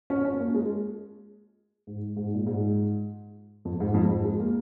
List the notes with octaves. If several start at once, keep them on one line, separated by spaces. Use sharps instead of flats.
C#4
C#4
A#3
G#3
G#2
G#2
A#2
G#2
F2
G#2
F2
G#2
G#3
A#3